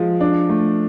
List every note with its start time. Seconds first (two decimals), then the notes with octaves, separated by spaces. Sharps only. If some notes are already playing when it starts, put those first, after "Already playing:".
Already playing: F3 G#3
0.20 D4
0.49 A3